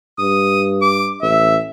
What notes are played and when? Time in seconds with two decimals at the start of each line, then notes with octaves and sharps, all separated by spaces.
0.19 G2 D#6
0.82 D6
1.22 A1 E5